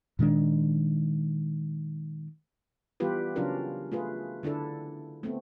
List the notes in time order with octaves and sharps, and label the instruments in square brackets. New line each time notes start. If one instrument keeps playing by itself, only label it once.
[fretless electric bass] A#2 D#3 G#3 D4
[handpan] E3 G3 B3 F4 G4 B4
C#3 F#3 C#4 D4 F4 A#4
A3 F4 G#4 B4
D3 D4 E4 A4
A3 B3 C4